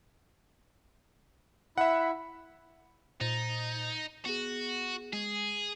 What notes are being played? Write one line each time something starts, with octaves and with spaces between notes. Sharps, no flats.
E4 E5 F#5
A#2 D#4 C5 A6
B3 F#4 G#4
G#3 G#4